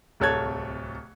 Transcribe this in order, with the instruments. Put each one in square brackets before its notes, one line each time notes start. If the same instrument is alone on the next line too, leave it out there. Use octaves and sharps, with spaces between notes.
[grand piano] D1 C2 A4 C#5 F#6 G#6